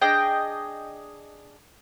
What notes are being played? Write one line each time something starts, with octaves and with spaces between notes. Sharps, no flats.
D4 G#4 D#5 G5